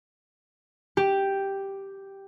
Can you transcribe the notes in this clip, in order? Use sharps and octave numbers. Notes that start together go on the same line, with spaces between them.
G4